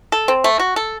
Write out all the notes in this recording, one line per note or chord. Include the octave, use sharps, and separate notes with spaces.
A4
C4
A3
F#4
A4